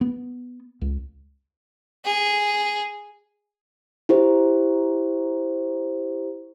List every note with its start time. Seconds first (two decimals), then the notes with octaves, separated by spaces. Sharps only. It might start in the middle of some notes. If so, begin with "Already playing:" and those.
0.01 B3
0.81 C#2
2.05 G#4
4.09 E4 G4 C5